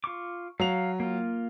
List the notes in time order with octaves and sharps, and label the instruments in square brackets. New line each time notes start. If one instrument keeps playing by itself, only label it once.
[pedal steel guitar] F4 C#6 D6
[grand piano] F#3 F7 [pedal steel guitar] F5
[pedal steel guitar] A#3 F4